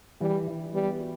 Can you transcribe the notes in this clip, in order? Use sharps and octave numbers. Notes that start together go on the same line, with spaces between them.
E3 G3
E3
G3 B3
F#4